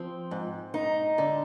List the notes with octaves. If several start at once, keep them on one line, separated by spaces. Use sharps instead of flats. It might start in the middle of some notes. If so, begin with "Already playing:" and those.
Already playing: F3 C4
G#2
D#4
D3